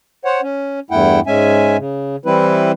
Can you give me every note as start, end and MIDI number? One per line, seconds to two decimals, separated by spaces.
0.25 0.41 72
0.25 0.41 73
0.25 0.41 78
0.42 0.80 61
0.91 1.20 40
0.91 1.20 43
0.91 1.20 57
0.91 1.20 64
0.91 1.20 78
0.91 1.20 79
1.27 1.77 44
1.27 1.77 56
1.27 1.77 61
1.27 1.77 76
1.27 1.77 80
1.78 2.16 49
2.26 2.72 52
2.26 2.72 55
2.26 2.72 60
2.26 2.72 64
2.26 2.72 71